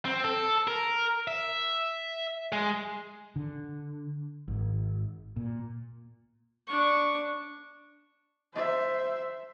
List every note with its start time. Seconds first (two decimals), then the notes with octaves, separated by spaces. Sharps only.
0.05 C4
0.24 A4
0.68 A#4
1.28 E5
2.52 G#3
3.36 D3
4.48 G#1
5.36 A#2
6.67 D4 C#6
8.54 C5 E5